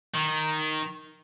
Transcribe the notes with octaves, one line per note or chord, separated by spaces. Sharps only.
D#3